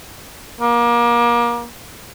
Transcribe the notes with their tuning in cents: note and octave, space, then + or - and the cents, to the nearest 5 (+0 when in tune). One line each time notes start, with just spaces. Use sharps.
A#3 +30